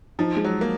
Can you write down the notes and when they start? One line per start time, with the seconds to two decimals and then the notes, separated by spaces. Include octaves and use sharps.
0.19 F3 D#4
0.36 G#3
0.44 F#3
0.61 A#3